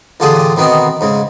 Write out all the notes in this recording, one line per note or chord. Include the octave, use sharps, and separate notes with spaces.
A1 D3 F4 G4 G#4 D#6
B2 D#3 B3 C4 D#4
G#2 C#3